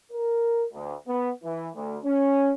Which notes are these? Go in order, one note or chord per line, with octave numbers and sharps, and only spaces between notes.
A#4
D2
B3
E3
D2
C#4